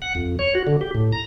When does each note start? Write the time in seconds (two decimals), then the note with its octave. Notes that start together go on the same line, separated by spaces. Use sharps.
0.02 F#5
0.15 F2
0.39 C#5
0.55 F#4
0.67 D3
0.81 G4
0.95 A2
1.12 A#5